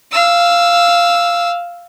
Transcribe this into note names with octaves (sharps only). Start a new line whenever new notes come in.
F5 E6